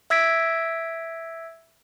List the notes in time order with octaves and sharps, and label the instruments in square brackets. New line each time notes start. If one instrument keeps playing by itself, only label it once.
[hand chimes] E5 E6 G#6 B6 D7